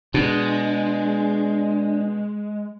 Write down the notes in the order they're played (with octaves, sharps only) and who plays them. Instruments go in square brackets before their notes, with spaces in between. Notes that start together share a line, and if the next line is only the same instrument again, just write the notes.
[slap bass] B2 [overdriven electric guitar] G#3 [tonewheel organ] D4